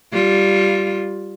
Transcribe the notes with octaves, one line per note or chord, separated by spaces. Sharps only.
G3 F4